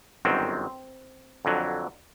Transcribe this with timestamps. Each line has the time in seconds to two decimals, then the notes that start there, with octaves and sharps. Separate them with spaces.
0.25 G1 F#2 D#3 F#3 C4
1.45 F2 D3 F#3